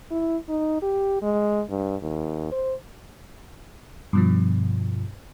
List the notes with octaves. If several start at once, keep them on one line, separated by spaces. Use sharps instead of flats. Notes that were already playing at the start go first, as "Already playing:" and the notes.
E4
D#4
G4
G#3
G2
D#2
C5
G2 B2 F3